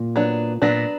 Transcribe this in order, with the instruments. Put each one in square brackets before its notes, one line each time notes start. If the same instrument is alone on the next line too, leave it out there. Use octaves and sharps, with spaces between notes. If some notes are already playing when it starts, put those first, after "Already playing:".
Already playing: [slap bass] A#2
[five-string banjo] F#3 B3 D4
[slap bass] A#2 [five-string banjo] F#3 B3 D4